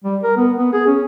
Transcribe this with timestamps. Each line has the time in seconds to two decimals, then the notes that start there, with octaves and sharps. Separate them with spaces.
0.04 G3
0.23 A#4
0.37 B3
0.57 B3
0.73 G#4
0.87 C#4